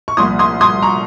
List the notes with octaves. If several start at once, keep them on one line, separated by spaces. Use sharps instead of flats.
C#6
C2 A#2 F3 C6 D#6
C6 D#6
C6 D#6
A#5 C#6